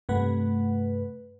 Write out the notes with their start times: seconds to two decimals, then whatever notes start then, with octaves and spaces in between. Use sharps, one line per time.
0.09 G2 C3 A3 B4 F#5